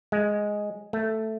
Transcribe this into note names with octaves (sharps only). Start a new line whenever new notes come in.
G#3
A3